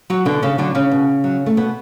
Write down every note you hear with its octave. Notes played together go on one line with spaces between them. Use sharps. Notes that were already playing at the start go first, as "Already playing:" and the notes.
F#3 F#4
B2 D3 D4
C#3 C#4
D3 F#3 D4
C#3 C#4
B2
F#3
A3
B2 B3